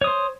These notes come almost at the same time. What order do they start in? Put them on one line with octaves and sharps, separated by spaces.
C#5 D#6 C5